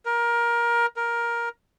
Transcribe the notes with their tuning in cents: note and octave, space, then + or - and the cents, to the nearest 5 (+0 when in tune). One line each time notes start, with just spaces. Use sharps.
A#4 +20
A#4 +10